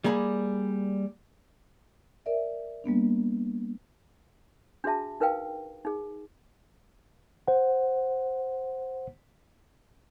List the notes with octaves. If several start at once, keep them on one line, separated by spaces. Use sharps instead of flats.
G3 A#3 G#4 A#5 B5
A#4 D5 E5
G3 A#3 B3 D4
D4 F#4 G#4 E5 A5
D#4 A#4 B4 F5 G5
D#4 G#4
C5 F#5